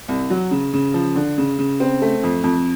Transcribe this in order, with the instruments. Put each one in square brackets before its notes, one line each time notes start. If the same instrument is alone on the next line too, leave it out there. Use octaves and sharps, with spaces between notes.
[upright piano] C2
F#3
C#3
C#3
F3
D3
C#3
C#3
C4
A3
F2
F2